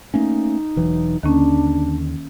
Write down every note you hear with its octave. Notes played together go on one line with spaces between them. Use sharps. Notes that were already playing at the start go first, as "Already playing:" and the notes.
A3 A#3 C#4 D#4
E1 E3 F#3
D#2 D3 D#3 A#3 C#4 D4